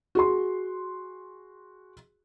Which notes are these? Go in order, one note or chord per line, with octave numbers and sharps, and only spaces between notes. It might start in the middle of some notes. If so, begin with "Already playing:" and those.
F#4 G#4 C6